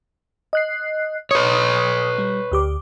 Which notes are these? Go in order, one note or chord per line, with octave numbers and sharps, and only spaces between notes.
D#5 F#6 C7
B4 C#5 D#6
G3
D2 G4 D6